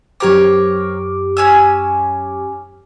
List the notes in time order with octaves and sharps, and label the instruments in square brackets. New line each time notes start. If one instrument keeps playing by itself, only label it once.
[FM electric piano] F#2 G4 D6 [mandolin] C4 A#4 C#5
[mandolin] C#4 G#5 E6